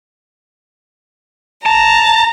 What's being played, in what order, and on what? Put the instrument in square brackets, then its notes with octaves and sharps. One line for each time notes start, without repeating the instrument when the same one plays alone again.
[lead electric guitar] A5 [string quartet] A#5